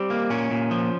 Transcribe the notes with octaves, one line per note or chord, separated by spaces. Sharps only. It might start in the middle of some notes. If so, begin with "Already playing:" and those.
Already playing: G3 C4
A#3
A#2 C#4
A#2
F3